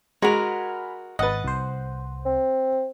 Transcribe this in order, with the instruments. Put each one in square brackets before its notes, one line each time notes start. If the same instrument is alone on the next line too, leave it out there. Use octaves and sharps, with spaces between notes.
[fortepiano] G#3 [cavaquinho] F#4 A#4 [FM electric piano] G#5 B5 F6
[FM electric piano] G#1 A6 [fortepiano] B4 D#5 [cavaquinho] F#5
[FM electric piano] C2 C5
[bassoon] C4